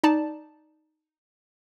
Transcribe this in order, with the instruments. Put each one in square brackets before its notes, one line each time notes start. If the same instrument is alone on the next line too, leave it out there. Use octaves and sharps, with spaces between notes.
[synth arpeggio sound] D#4 D5 A5